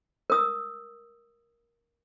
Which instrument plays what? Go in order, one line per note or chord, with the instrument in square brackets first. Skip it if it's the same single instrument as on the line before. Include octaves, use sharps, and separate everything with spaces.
[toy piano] A#4 D#6 E6